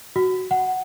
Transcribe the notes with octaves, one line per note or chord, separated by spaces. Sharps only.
F#4
F#5